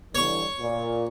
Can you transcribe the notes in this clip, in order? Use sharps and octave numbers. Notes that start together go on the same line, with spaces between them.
D3 E3 G3 C#5 C#6
A#2